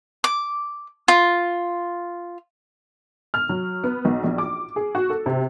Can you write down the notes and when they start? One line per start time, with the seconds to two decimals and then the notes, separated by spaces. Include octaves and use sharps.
0.24 D6
1.08 F4
3.34 F6
3.49 F#3
3.84 B3
4.05 B1
4.24 A#1
4.38 D6
4.76 G#4
4.95 F#4
5.10 A4
5.26 C3